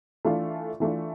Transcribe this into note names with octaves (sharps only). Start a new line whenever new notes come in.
E3 A3 D4 F4
E3 A3 D4 F4